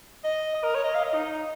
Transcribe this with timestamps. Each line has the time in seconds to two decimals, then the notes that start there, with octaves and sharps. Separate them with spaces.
0.24 D#5
0.54 D#5
0.64 A#4
0.75 C#5
0.84 D#5
0.95 F5
1.04 D#5
1.14 D#4